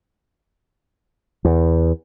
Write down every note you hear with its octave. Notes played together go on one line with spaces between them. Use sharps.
E2